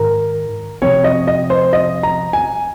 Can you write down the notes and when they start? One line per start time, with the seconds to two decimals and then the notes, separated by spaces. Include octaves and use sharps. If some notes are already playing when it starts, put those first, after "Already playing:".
Already playing: G#2 D#3 A#4
0.82 C3 F3 C4 C#5
1.04 D#5
1.27 D#5
1.50 C5
1.73 D#5
2.03 A#5
2.33 G#5